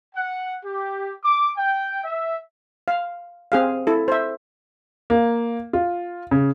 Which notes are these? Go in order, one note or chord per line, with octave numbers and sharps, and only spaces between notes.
F#5
G4
D6
G5
E5
F5
C4 G#4 F5
E4 A4
C5 E5
A#3
F4
C#3